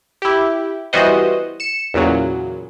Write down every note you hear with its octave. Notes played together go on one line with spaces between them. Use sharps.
E4 G4
E3 G3 B3 F#4 C5 D#5
C#7 E7
E2 A#2 C#3 F#3